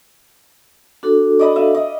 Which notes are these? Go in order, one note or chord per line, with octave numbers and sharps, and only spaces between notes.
D4 F#4 A4
D5 D#5 B5
E5 F5
D#5